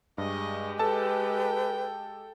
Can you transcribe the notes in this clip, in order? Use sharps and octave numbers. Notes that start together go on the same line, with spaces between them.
G2 G#3 G4 D#5 C#6
A4 B4 G5 A5